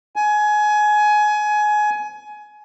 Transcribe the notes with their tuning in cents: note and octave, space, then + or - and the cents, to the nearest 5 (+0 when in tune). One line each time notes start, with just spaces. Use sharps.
G#5 +20